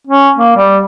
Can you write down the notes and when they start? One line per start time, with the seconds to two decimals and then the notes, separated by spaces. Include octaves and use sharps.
0.07 C#4
0.37 A#3
0.56 G3